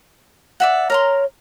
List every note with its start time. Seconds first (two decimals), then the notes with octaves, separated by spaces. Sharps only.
0.60 D5 E5 F#5
0.90 A#4 C#5 A#5 C6